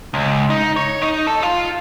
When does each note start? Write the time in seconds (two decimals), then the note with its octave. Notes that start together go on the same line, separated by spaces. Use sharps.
0.14 C#2
0.50 D#4
0.77 C#5
1.02 D#4
1.27 A4
1.43 F4